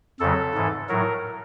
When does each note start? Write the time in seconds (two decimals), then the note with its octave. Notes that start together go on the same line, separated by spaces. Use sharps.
0.20 F2 C#3 F#3 A4
0.55 G#2 E3
0.89 A2 F#3 A#4